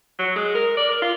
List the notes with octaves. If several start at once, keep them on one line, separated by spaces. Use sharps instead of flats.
F#3
G#3
A#4
D5
A#4
F4